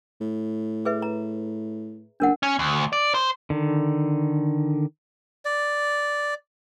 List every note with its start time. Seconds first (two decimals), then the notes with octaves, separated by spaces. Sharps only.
0.21 A2
0.85 G#4 B4 E5
1.02 A#5
2.20 F#1 D4 A#4 F#5
2.43 C#4
2.59 D2
2.93 D5
3.14 C5
3.50 D3 D#3
5.45 D5